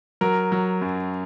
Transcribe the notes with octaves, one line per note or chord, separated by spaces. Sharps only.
F#3 A#4
F#3
F#2